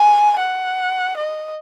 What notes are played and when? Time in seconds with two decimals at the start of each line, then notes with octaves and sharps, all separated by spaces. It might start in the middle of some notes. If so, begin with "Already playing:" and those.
Already playing: G#5
0.40 F#5
1.17 D#5